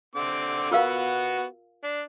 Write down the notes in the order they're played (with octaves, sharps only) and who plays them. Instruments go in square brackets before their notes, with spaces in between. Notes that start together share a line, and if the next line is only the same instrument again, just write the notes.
[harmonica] D3 C4 D6
[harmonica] B3 F#4 [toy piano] F4 A#4 F5
[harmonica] D4